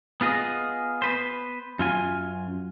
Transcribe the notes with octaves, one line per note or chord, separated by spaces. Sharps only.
B3 F4 G#4 D#5
B3 B4 C5
F#2 F4 G#5